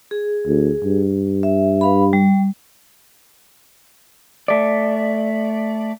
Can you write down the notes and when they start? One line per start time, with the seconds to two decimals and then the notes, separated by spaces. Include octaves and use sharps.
0.11 G#4
0.47 D2
0.84 G2
1.43 E5
1.81 B4 F5 B5
2.13 G3
4.48 A3 D5